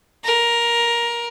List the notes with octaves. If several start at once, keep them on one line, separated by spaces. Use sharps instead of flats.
A#4